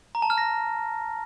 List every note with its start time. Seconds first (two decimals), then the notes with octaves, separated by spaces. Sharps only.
0.15 A#5
0.22 A5
0.30 F6
0.38 A#6